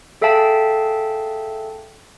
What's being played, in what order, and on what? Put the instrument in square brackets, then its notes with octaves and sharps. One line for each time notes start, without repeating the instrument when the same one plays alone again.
[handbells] G#4 A4 E5 F5 G5 A5